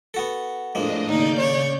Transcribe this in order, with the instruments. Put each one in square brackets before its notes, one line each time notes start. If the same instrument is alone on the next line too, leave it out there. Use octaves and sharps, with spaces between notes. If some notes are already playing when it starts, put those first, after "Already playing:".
[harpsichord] B3 F#4 A4
[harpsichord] F2 G#3 A#3 [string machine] A2 D4 D#5
[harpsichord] D#2 [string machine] C#3 D5 G6 [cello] A#3 D#4
[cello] C#5